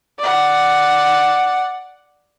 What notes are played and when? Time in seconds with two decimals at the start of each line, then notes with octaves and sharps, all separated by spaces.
0.19 D5 F#5